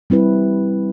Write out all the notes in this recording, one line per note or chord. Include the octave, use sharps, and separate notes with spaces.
G3 C4 E4 B4